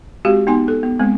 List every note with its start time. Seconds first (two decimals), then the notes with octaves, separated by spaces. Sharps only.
0.25 G#3 C4 F#4 G4 F5
0.47 B3 D#4 G#5 C6
0.68 A4
0.83 B3
0.99 G#3 B3 C4